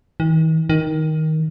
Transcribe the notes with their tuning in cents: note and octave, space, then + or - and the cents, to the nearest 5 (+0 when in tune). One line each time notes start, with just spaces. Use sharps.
D#3 +45
D#3 +10